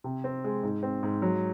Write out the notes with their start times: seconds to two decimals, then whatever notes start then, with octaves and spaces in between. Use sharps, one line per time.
0.04 C3
0.24 C4
0.44 G#3
0.63 G#2
0.83 C4
1.03 G#2
1.22 F#3